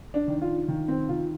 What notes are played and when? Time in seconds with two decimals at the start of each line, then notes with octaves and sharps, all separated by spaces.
0.14 D4
0.28 D#3
0.41 F4
0.68 D#3
0.88 C4
1.09 D#3 F4